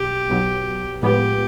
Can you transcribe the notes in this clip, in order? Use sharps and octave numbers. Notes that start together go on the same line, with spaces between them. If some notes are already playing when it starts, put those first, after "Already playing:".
Already playing: B1 B2 G4
B1 B2 F#3
A2 F3 G#3 B3 G4